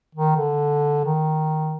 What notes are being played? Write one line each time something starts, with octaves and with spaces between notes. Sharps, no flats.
D#3
D3
D#3